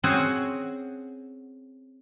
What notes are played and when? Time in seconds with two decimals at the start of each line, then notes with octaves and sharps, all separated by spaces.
0.04 C4 C#4 F#4 G#4 F#5